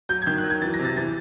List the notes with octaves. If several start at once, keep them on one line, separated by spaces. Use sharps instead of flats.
F#3 G6
G#6
D#3 G6
F#6
F#3
G#6
E3 A6
A#6
C3
A6
E3 A6